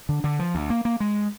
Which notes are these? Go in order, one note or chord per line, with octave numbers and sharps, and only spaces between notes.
D3
D3
F3
D2
A#3
A#3
G#3